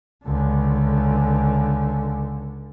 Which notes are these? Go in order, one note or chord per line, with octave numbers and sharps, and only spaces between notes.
C#2 D3